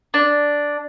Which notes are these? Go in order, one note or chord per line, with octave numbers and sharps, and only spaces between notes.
D4